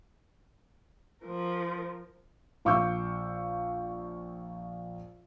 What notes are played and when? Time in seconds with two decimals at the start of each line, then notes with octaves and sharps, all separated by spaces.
1.23 F3 A#4
2.65 A#1 F5 C#6 D6 E6 G6